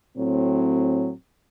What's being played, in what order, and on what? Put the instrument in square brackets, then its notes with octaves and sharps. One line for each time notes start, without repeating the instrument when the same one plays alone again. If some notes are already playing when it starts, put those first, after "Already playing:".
[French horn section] A2 F#3 C4